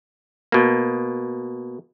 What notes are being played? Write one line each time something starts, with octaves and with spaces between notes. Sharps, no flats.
B2 A#3